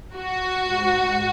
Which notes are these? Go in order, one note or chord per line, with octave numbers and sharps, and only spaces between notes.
F#4
G#2